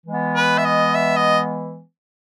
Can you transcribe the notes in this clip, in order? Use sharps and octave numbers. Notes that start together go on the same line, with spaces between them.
E3 G#3 B3
B4
E5
D#5
E5
D#5